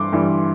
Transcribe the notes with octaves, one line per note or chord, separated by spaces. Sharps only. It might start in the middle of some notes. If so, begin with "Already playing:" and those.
Already playing: G2 E3 C6 D6
G2 E3 G3